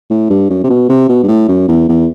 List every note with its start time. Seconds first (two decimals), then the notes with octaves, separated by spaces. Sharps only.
0.10 A2
0.30 G2
0.50 F#2
0.64 C3
0.70 B2
0.89 C3
1.09 B2
1.23 G2
1.28 A2
1.48 F#2
1.68 E2
1.88 E2